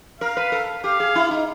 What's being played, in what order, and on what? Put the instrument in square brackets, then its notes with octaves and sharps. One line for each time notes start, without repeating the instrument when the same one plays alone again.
[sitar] A#4 [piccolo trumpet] F5
[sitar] B4
A4
[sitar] G4 [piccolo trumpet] F5
[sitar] G#4
E4
D#4